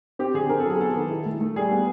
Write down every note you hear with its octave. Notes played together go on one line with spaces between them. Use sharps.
C4 G4
D3 G#4
C4 A#4
A4
F#3 G#4
B3 A4
D#3
E4
A3
A3
G3 G#4
B3